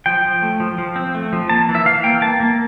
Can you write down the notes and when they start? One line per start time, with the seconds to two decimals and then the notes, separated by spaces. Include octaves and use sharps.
0.06 F3 G5
0.25 F3
0.42 A3
0.60 F3
0.78 F3
0.96 C4
1.15 A3
1.33 F3
1.50 A#3 A5
1.69 E3
1.75 E5
1.85 E3 F5
2.04 A#3 G5
2.21 A#3 A5
2.40 A#3